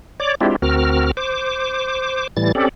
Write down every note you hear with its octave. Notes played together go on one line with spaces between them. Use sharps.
C#5 D5 D6
G#3 C4 D4 E4 F4 G4
D2 C4 F#4 A#4 F6
C5 D6
A2 E3 G3 A6
C4 C#4 G4 A4 D5